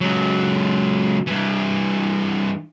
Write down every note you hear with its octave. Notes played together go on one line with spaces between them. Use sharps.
C#2 F#3
G2 E3